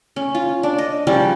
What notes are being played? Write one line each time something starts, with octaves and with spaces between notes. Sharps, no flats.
C#4
F4
D4
D#5
C#3 F3 G3 C#4